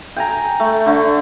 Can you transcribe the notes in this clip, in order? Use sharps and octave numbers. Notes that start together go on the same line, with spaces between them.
G5 G#5 A#5
A3
D3 A3